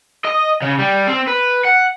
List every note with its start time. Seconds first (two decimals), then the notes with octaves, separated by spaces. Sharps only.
0.25 D#5
0.62 C#3
0.79 G3
1.08 C4
1.28 B4
1.65 F#5